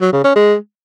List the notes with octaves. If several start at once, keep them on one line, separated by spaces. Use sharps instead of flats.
F#3
C#3
C#4
G#3